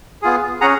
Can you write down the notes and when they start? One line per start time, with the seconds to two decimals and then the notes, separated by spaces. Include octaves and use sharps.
0.22 B3 F4 G#4
0.61 C#4 G#4 F#5 A#5